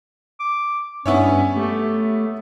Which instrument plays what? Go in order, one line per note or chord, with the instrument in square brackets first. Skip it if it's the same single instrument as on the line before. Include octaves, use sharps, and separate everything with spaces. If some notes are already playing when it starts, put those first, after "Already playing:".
[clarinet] D6
[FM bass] G2 [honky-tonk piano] B3 E4 C#5 [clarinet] C#4
[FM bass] A3 [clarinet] G4